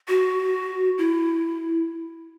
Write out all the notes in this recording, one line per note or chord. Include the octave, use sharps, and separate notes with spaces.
F#4
E4